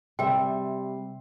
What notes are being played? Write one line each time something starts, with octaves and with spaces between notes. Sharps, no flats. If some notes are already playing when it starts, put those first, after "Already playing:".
C3 G3 E5 G5 C6